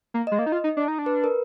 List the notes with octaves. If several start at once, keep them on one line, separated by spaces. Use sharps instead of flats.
A#3
G#3 D#5
A#3
D#4
F4
D#4
D4
D#4
D4
B4
A#4